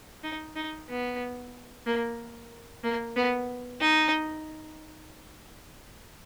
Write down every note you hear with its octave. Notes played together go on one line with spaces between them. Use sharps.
D#4
D#4
B3
A#3
A#3
B3
D#4